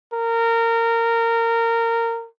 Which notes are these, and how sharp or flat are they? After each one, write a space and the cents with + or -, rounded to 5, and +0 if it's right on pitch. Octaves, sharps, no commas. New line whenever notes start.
A#4 -20